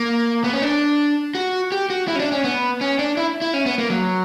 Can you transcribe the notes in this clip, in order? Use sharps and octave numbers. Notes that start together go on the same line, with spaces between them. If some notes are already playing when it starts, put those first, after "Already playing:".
Already playing: A#3
B3
C#4
D4
F#4
G4
F#4
E4
C#4
D4
C#4
B3
C#4
D4
E4
E4
C#4
B3
A#3
F#3